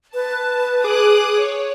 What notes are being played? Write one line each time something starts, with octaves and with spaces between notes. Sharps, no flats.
B4 A5
G#4 D6 D#6 F#6
C#5